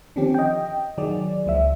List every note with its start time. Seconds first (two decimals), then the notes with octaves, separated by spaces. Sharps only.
0.16 D3 D#3 F3 C4 C#4 G4
0.34 D#5 G5
0.98 D#3 F#3 G#4 D5
1.46 C#2 F3 E5